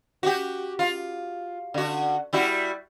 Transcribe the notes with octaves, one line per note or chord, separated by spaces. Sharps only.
F#4 G4
F4
D3 F#4
G3 E4 F#4